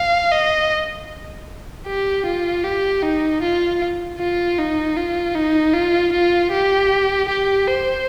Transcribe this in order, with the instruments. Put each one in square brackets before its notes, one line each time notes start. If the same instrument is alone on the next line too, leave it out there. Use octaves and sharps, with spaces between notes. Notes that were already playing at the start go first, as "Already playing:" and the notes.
Already playing: [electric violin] F5
D#5
G4
F4
G4
D#4
F4
F4
D#4
F4
D#4
F4
F4
G4
G4
C5